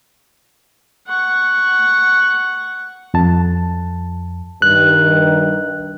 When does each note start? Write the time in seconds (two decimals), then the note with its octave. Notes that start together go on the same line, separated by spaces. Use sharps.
1.07 F#5 C#6
3.14 F2 A5
4.62 G2 D#3 F#6